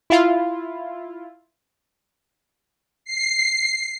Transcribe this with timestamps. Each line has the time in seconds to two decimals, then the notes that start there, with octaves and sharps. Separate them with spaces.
0.10 E4 F4
3.05 C7